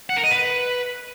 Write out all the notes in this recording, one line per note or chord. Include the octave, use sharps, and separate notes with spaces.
F#5
A#4
D#5
B4